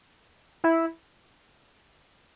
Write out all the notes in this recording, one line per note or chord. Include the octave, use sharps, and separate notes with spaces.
E4